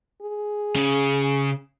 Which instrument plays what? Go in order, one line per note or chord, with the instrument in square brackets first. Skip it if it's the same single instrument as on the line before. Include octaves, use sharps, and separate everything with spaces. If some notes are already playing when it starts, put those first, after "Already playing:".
[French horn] G#4
[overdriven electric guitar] C#3